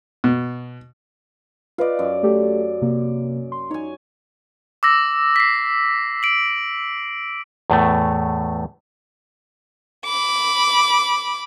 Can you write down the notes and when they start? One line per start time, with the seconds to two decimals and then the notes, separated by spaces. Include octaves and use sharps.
0.24 B2
1.78 F4 B4 D5 D#5 F5
1.99 F#2
2.23 A3 G4 A4
2.82 C3 A#3
3.52 C6
3.71 D#4 C#5 G#5
4.83 D6 E6 A#6
5.36 B6 C7
6.23 D7 F#7
7.70 E2 A2 A3
10.06 B5 D6